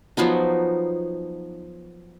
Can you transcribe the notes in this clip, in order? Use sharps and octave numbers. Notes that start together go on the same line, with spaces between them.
F3 F#3 B3 D#4